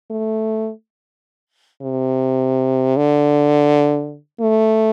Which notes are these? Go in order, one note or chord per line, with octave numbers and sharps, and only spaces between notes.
A3
C3
D3
A3